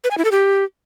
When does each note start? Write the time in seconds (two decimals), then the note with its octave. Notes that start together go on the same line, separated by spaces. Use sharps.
0.04 B4
0.11 G#5
0.18 E4
0.25 A4
0.31 G4